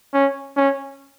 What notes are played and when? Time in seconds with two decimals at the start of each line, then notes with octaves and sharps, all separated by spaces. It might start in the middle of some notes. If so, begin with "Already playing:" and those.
0.14 C#4
0.56 C#4